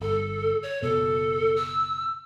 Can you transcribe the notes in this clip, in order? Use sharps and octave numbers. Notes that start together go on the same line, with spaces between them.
G1 A4
C#5
F#1 B2 A4
E6